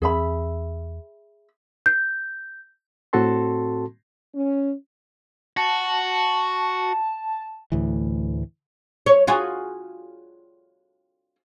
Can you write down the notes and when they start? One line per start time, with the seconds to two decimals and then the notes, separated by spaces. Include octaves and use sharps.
0.02 E2 C4 G#4 E5 B5
1.86 G6
3.13 A2 C4 F#4 A4 A5 C6
4.33 C#4
5.57 F#4 A5
7.72 D2 A2 E3
9.06 C#5
9.27 F4 F#4 G#4